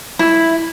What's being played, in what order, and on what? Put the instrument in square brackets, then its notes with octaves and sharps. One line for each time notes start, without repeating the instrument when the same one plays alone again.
[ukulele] E4